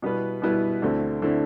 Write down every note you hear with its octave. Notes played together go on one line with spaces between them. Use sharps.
B2 G3 B3 E4 B4
B2 G3 B3 E4 B4
D2 D3 A3 C4 E4
D3 A3 C4 E4